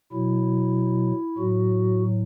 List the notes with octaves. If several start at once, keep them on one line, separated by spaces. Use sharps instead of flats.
B2 F#3 E4
A2 F#3 F#4